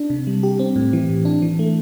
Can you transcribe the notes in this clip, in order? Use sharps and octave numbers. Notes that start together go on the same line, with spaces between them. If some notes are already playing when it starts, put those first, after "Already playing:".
Already playing: D4
C3
G3
G4
C4
A2
E3
A2
D4
E3
A3